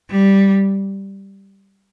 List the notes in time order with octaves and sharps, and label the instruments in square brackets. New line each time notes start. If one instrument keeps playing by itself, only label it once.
[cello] G3